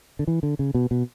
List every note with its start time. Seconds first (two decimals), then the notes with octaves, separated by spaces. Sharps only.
0.19 D3
0.27 E3
0.43 D3
0.59 C#3
0.74 B2
0.91 B2